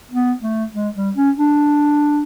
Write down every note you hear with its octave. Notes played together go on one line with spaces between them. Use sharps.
B3
A3
G#3
G3
C#4
D4